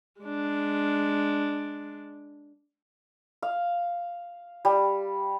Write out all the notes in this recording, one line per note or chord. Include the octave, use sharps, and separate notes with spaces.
G#3 D4
F5
G3